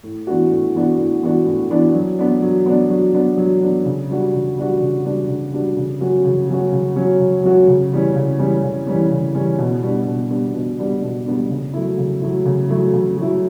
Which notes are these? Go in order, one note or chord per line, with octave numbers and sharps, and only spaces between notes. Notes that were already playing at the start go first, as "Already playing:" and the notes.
A2
E3 B3 D4 F#4
A2
E3 B3 D4 F#4
A2
E3 B3 D4 F#4
A2
E3 B3 D4 F#4
F#3
B3 D4
F#3
B3 D4
F#3
B3 D4
F#3
B3 D4
C#3
G3 D4 F#4
C#3
G3 D4 F#4
C#3
G3 D4 F#4
C#3
G3 D4 F#4
C#3
F#3 C#4 F#4
C#3
F#3 C#4 F#4
C#3
F#3 C#4 F#4
C#3
F#3 C#4 F#4
C#3
E3 G3 C#4
C#3
E3 G3 C#4
C#3
E3 G3 C#4
C#3
E3 G3 C#4
B2
G3 B3 D4
B2
G3 B3 D4
B2
G3 B3 D4
B2
G3 B3 D4
C#3
F#3 A3 E4
C#3
F#3 A3 E4
C#3
F#3 A3 E4
C#3
F#3 A3 E4